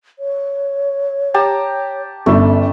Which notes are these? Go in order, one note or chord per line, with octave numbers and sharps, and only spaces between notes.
C#5
G4 A5 A#5
G1 A3 C#4